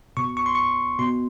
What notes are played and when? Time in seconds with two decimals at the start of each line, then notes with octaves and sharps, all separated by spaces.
0.17 B2 C#6
0.37 C#6
0.46 C6
0.55 C#6
0.99 B2 C6